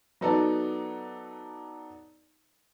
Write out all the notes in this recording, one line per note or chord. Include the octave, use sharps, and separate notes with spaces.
F#3 B3 D#4 A4 D5